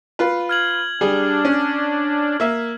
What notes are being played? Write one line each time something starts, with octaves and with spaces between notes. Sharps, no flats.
F4 B4
F6 G#6 F#7
G3 D4 G#4
C#4
A#3 E5